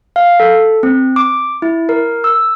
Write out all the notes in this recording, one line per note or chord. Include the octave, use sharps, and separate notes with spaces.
F5
A4
C4
D6
E4
A#4
E6